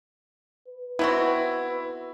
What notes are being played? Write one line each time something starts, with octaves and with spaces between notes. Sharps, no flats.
B4
B3 C4 E4 F#4